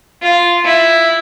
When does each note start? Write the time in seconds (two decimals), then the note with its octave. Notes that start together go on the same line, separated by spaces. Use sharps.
0.22 F4
0.64 E4